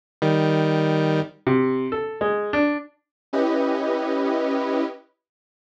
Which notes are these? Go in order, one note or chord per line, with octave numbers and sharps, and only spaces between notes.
D#3 G3
C3
A4
G#3
D4
C#4 E4 G4 B4 D#5